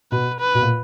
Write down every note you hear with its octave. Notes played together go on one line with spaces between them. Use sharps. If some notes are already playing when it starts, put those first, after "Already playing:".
B2 B4
B4
B2
A#2